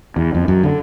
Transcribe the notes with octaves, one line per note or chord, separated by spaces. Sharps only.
E2
F2
F#2
D3